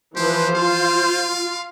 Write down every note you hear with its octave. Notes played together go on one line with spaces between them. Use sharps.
E3 F3 G4 B4 C5
F4 F5